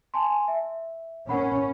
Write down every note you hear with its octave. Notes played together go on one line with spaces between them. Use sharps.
G#5 A5 C6
E5
C#4 A#4 F#5 B5